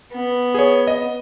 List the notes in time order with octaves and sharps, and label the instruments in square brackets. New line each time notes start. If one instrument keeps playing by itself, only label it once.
[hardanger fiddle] B3
[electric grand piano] G#4 C#5
D#5